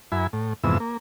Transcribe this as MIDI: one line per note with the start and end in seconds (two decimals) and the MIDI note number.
0.12 0.27 42
0.12 0.27 64
0.12 0.27 80
0.12 0.27 83
0.33 0.53 45
0.64 0.78 41
0.64 0.78 44
0.64 0.78 48
0.64 0.78 52
0.64 0.78 59
0.64 0.78 88
0.80 0.97 58